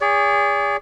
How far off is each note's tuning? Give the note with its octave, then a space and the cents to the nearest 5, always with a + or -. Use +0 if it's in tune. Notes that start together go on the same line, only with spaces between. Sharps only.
G#4 -25 D5 -45